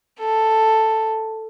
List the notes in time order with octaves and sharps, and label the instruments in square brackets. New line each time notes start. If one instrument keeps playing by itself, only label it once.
[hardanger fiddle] A4